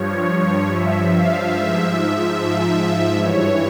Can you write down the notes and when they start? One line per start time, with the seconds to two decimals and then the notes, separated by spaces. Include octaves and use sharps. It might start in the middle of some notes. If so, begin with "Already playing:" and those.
Already playing: G2 F3 C#5
0.27 C#5
0.68 G2 F3 E5
1.10 F5
1.51 G#2 F3 E5
2.35 G#2 F3
3.17 G2 E3 C#5